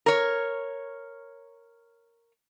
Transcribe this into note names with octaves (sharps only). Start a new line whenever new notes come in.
A#4 C#5